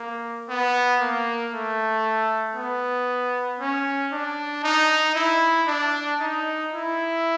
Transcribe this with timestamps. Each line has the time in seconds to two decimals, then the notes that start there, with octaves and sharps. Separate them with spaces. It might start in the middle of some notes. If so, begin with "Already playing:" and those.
Already playing: A#3
0.49 B3
1.01 A#3
1.53 A3
2.55 B3
3.60 C#4
4.12 D4
4.64 D#4
5.15 E4
5.67 D4
6.20 D#4
6.72 E4